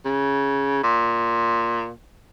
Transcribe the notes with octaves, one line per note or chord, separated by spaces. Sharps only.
C#3
A#2